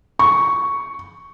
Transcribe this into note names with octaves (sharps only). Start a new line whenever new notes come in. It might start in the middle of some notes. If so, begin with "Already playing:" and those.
C#6